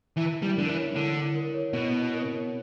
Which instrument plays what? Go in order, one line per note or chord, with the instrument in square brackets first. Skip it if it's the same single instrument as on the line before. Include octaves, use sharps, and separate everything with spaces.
[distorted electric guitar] E3 [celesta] E4
[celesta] E4
[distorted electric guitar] G3
[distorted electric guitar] D3 [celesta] A#4
[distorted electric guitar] E3
[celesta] C#5
[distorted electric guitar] D3 [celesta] E4
[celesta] E4
A#4
C#5
[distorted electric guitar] B2 [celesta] E4
[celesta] E4
A#4
C#5